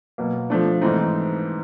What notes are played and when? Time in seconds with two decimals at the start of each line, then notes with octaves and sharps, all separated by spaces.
0.18 B2 F#3 A#3
0.50 F3 A3 D4
0.81 G#2 E3 A3 C4 D#4